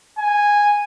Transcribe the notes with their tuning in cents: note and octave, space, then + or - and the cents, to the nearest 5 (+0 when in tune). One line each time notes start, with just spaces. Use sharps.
G#5 -10